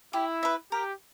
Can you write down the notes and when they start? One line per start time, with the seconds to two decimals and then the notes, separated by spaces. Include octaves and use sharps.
0.13 E4 G4
0.43 B4 E5
0.72 G4 A#4